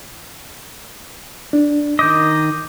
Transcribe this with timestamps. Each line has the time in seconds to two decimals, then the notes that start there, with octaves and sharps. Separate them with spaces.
1.53 D4
1.99 D#3 D#5 D6 G6